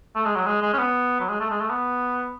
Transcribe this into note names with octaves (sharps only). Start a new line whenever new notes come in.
A3
G#3
F#3
G#3
G#3
C#4
B3
F#3
G#3
A3
G#3
A3
B3